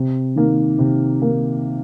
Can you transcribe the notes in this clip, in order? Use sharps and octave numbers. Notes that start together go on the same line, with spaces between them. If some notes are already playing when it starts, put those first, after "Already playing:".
Already playing: C3
D#3 A#3
C3
D#3 A#3